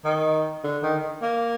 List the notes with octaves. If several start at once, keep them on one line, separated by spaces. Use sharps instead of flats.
D#3
D3
D#3
A#3